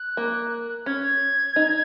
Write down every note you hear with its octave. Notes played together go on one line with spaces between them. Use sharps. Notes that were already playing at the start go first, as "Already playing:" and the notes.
Already playing: F#6
A#3
C#4 G#6
D#4